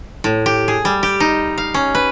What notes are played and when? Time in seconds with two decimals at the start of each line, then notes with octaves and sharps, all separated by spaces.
0.24 A2
0.46 G4
0.68 G#4
0.85 G3
1.03 G4
1.20 D#4
1.58 F5
1.74 C#4
1.95 B4